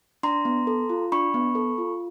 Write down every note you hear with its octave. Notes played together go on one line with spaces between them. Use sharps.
D4 A#5 C6
B3
A4
F4
D4 B5 C#6
B3
A4
F4